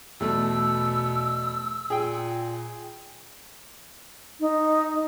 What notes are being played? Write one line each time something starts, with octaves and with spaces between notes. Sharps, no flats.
E2 B2 A3 E6
A#2 G#4 G5
D#4